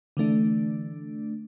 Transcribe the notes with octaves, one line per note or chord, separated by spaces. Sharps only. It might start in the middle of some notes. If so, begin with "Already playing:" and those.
D3 E3 A3 D4